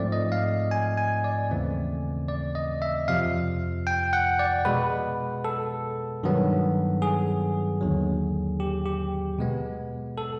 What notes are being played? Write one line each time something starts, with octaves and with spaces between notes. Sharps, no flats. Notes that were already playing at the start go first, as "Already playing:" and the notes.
Already playing: G#2 F3 A3 C4 D5
D#5
F5
G#5
G#5
D5
D#2 C#3 E3 A3 C4
D5
D#5
E5
F2 C3 F3 F5
G5
F#5
D5
B2 G#3 B3 B4
A4
G2 D#3 F#3 B3
G#4
D#2 D3 F#3
G4
G4
B2 G#3 B3
A4